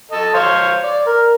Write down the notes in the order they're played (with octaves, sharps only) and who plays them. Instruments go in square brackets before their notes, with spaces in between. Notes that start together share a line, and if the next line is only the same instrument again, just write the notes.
[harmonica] A4 D#5
C5 C#5 F5
D5
A#4